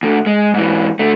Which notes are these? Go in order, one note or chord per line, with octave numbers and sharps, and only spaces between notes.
D2 D3
G#3
G#2 E3
D3 A3